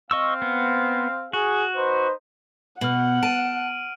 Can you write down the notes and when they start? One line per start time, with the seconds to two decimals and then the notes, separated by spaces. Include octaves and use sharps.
0.11 C4 D#5 F5 C#6 E6
0.42 B3
1.33 F#4 G#4
1.76 D#4 B4 C5
2.81 B2 F#5 F6 F#7
3.23 A5 D7 D#7